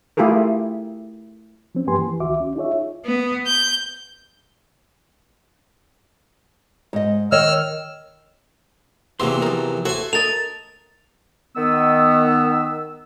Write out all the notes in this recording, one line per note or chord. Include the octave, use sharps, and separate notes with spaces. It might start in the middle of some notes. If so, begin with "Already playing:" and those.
A3 E4 F4 G4 G#4 A#4
F3 C4 C#4
G2 A#3 G4 B4 G#5 C6
E3
C#2 D#3 F#4 E5 D6
C#4
D#4 F4 G#4 C#5 E5
B3
G6
G#2 D#5
D#3 C#5 D#5 E6 F6
E2 C3 F#3 A#3 C6
F3 A#4
F#4 A4 C5 E5 G#5
A4 A#4 D#5 A6 F7
D#3 B3 E6